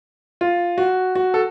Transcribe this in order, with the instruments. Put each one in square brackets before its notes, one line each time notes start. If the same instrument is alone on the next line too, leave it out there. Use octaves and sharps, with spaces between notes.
[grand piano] F4
F#4
F#4
A4